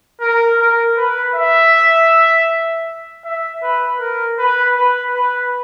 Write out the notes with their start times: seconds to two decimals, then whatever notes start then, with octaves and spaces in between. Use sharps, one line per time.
0.21 A#4
0.59 A#4
0.97 B4
1.35 E5
3.25 E5
3.63 B4
4.00 A#4
4.39 B4
4.76 B4
5.15 B4